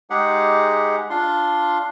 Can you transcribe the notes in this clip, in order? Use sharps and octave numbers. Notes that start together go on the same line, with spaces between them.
G#3 D#4 G4 G#4 F#5
D4 F4 C6